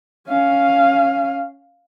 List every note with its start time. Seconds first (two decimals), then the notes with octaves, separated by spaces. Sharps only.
0.28 C#4 F5